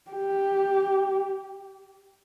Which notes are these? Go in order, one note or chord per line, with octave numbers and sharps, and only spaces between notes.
G4